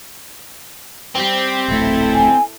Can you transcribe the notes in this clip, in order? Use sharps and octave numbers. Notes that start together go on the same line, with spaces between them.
G3 C4 G4
D1 A#1 A3 E4 A4
G#5